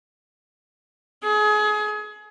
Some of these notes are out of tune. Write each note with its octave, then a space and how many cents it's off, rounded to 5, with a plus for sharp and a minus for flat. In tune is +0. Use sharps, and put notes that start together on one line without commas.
G#4 +30